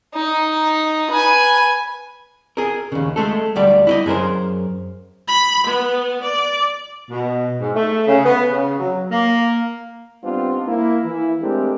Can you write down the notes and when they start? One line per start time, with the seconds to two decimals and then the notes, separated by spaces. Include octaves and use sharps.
0.14 D#4
1.10 B4 G#5
2.57 G#4 A#4
2.92 D#2 C#3
3.16 G#3 A3 A4
3.56 D2 G3 D5
3.87 E4 D5 D#5
4.06 F#2 G#4 A#4 C5
5.28 B5
5.68 B3
6.24 D5
7.10 B2
7.61 G#2
7.75 A3
8.07 C#3
8.25 B3
8.51 C#3
8.79 F#3
9.11 A#3
10.24 G3 B3 C4 D4 D#4 F4
10.68 A#3 E4
11.04 E3 E4
11.42 G#3 A3 C4 D4 G4 A#4